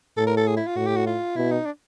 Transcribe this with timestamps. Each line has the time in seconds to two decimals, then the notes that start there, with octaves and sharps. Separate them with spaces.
0.17 A2 A4
0.27 A#4
0.37 A4
0.47 G#4
0.57 E4
0.67 F4
0.76 A2 F#4
0.87 G4
0.96 F#4
1.06 F4
1.36 B2 E4
1.51 D#4
1.66 D4